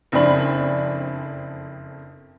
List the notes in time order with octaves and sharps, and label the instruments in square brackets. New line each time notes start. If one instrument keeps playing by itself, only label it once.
[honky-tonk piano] F#1 F2 C4 D4 B5 F#7